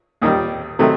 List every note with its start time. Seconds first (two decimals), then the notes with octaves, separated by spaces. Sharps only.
0.22 D#2 D#3 G3
0.79 C3 D#3 F#3 A3